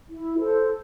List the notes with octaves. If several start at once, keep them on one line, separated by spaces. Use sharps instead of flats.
E4
A4 C5